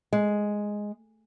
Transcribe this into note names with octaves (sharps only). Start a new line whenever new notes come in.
G#3